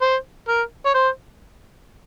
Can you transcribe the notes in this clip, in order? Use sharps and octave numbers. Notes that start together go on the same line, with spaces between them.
C5
A#4
C#5
C5